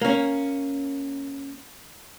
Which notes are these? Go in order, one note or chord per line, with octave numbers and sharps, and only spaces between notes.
A#3 C#4